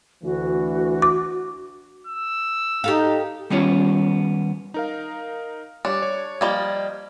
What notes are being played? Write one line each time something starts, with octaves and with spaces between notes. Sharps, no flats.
D2 E3 F#4
D6
E6
D#4 G4 A4 F5
D#3 G3 B3 C#4 F4 C#5
D#4 A#4 F5
G3 D4 C#5
C#5
F3 G3 A#3 D#5 G#6